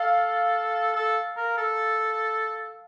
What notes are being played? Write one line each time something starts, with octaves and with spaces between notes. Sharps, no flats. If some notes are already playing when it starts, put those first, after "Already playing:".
Already playing: A4 F5
A4
A#4
A4